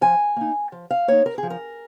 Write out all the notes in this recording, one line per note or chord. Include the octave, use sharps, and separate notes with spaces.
F3 G#5
A#3 D#4
F3
F5
A#3 D#4 C#5
A#4
G#4
F3
A#4